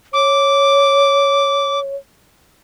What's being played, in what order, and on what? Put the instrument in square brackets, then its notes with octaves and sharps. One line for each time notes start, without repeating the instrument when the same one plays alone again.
[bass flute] C#5 [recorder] D6